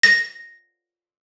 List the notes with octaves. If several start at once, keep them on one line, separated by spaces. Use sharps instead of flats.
A#6